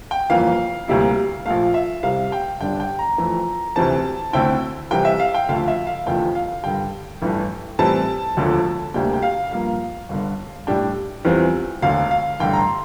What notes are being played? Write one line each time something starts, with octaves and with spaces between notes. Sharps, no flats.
G5
G1 F2 E3 A#3 F5
D2 C3 G3 A#3 E4
A#1 A#2 A3 F5
E5
C2 C3 G3 F5
G5
G1 G2 D3 G3 D4 G5
G5
A#5
F2 E3 A3
D2 C3 E3 A3 C4 A5
D2 D3 A3 C4 E4 G5
C2 C3 E3 G5
E5
F5
G5
D2 D3 F3 A3 F5
E5
F5
F1 E2 D3 F3 A3 G5
F5
G2 D3 G3 G5
A1 G2 E3 A3
A2 E3 G3 C4 E4 A5
E1 D2 D3 F3 A3
D2 C3 G3 A#3 D4 G5
G5
F5
G2 F3 A#3 F5
G1 G2 D3
A2 G3 D4 G5
E2 E3 G3 C4 F4
E1 D2 D3 F5
F5
A1 G2 D3 A3 G5
A#5
C6